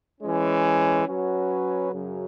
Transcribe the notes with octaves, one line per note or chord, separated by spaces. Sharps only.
E3 G#3 C#4
F#3 C#4 F#4 B4
F#2 C#3 F#3